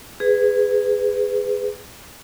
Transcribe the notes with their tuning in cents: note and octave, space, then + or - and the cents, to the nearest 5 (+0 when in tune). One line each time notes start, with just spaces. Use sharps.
G#4 -10 B4 +20